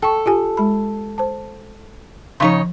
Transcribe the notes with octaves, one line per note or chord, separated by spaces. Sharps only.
A4 G5 C#6
F4 G4 G#5
G#3 B5
C5 A5
C#3 F3 D#4 C#5 C6